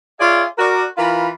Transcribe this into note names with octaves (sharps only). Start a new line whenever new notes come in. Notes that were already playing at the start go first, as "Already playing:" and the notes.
F4 G#4 C#5 D5 E5 F5
F#4 A#4 D5
E3 F4 A#4 B5